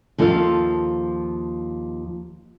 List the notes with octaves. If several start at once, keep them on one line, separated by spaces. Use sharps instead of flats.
D#2 F3 A4 C5 D#5 F5